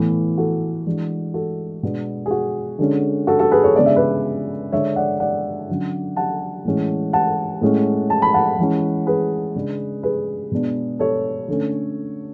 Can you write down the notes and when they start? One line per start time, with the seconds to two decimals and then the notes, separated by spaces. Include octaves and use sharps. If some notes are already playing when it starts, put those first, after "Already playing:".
Already playing: A2 E3 B3
0.38 F#4 A4
0.86 E3 G#3 D4
1.34 F#4 A4
1.83 B2 G#3 B3 D4
2.26 G#4
2.31 F#4
2.79 D3 G#3 C#4
3.27 F#4 A4
3.39 F#4 A4
3.52 G#4 B4
3.64 A4 C#5
3.75 C#3 G#3 B3 D4 D5
3.86 E5
3.96 B4 D5
4.72 D3 G#3 D4 C#5 E5
4.96 D5 F#5
5.20 D5 F#5
5.69 D3 F#3 C#4
6.16 F#5 A5
6.65 A2 E3 G#3 C#4
7.13 F#5 A5
7.61 A2 G#3 C#4
8.10 A5
8.22 B5
8.34 F#5 A5
8.59 E3 G#3 C#4
9.07 G#4 B4
9.55 C#3 G#3 D4
10.03 G#4 B4
10.51 B2 G#3 B3 D4
10.99 A4 C#5
11.48 D3 A3 C#4